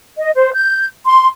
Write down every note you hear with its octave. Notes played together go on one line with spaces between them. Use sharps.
D#5
C5
G6
C6